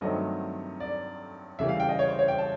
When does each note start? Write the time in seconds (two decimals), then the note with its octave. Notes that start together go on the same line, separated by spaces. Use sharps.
0.01 G2 D#3 F#3 A3 C4 D#5
0.80 D5
1.59 C#3 E3 G3 E5
1.69 F5
1.80 G5
1.89 D#5
1.99 C#5
2.08 C5
2.19 C#5
2.28 G5
2.38 A5